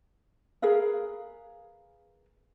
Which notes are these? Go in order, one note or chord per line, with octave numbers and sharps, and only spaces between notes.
G#4 A#4 B4 F5